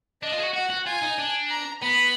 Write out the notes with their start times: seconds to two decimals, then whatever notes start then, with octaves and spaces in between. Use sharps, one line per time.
0.23 D4 D#5
0.33 F4
0.38 G#4
0.43 F#4
0.54 F#4 F#5
0.70 F#4
0.86 F4 G#5
1.02 D#4
1.18 D4
1.50 A#5
1.82 B3 B5